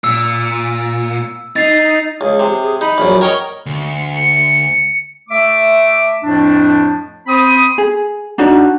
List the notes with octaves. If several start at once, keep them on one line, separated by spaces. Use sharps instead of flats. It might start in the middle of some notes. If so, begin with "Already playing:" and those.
A#2 E6
D#4 A6 C7
C#2 G#4
C3
G#4
D#4 B5
A#1 F#2
A#4 C#5 D#5 G5
D2
C#7
A3 E5 D6
F2 A2 F3 A3 D4
C4 C5 B5 D#6
G#4
D4 D#4 F#4 D5